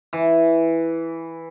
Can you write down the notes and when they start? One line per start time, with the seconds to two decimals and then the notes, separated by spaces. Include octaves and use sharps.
0.13 E3